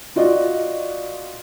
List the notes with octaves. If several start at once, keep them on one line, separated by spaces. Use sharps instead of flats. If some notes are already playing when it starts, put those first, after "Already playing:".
F4 F#4 D5 D#5